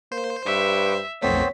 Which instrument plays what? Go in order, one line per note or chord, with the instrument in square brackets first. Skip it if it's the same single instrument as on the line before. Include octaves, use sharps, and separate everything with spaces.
[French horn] A#3 [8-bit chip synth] C5
[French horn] G2 [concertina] B4 C#6 D6 [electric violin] E5
[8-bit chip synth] B1 F2 A3 [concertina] B3 C4 C5 [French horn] C#5 [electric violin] B6